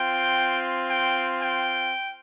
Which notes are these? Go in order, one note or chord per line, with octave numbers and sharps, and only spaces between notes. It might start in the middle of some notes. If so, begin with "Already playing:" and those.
Already playing: C4 F4 G5
G5
G5